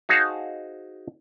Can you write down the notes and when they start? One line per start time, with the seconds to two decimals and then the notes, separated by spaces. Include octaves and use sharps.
0.09 D#4 F#4 G#4 C5 F5 A5